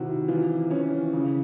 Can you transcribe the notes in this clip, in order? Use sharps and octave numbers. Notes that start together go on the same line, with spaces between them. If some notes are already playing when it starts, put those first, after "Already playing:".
Already playing: C3 D#3 E4 F#4
E3 F4
E3 C#4
C#3